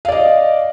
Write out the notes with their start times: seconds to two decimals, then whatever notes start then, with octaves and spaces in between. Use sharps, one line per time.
0.05 F5
0.08 D5
0.12 D#5